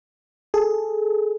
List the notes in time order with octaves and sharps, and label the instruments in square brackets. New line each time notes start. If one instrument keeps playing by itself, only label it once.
[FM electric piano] G#4 A4